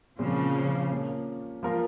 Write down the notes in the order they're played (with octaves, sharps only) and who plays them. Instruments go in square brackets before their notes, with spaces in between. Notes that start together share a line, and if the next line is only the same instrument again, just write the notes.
[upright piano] A#2 G#3 C4 [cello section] C#3 F3
[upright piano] F3 A#3 C#4
F3 A#3 F4 A#4